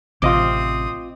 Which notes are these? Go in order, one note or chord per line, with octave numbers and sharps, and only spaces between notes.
A1 C3 C4 F4 D#5 D6 D#6